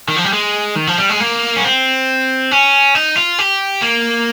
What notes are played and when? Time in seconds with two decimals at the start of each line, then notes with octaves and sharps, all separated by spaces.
0.08 D#3
0.16 F3
0.25 G3
0.33 G#3
0.76 D#3
0.87 F3
0.98 G3
1.09 G#3
1.20 A#3
1.56 C#4
1.64 C4
2.51 C#4
2.95 D#4
3.17 F4
3.39 G4
3.82 A#3